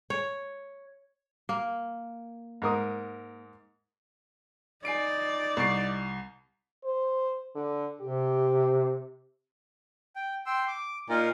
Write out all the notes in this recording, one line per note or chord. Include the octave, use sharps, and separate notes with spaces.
C#5
A#3
G#2 A#4 D#6
D#4 D5 G#5 C7 D7
C2 C#6 C7
C5
D3
C3 G4
G5
G5 C6 E6
D6
A#2 D#4 F4 A#4